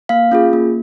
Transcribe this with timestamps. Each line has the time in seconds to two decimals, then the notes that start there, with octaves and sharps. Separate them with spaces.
0.09 A#3 F5
0.32 C#4 F4 G#4
0.53 A#3